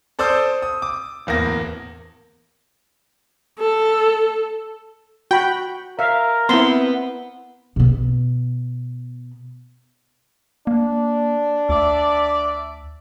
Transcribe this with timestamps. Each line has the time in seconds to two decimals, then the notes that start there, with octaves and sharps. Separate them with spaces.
0.19 A4 C5 D5 D#6 E6 G6
0.62 D#6
0.82 D6
1.27 D1 E2 A#3 A#6
3.59 A4
5.31 F#4 G5 B5
5.99 A#4 E5 F5
6.49 B3 C4 E4 C6
7.76 B2 B3
10.67 A#3 D4
11.69 D2 D5 E5